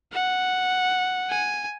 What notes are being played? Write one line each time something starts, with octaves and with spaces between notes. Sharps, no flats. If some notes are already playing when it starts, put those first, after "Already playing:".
F#5
G#5